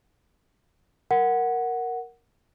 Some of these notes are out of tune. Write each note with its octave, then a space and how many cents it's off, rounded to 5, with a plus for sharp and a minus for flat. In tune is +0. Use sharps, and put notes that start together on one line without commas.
A#4 +0 F#5 +0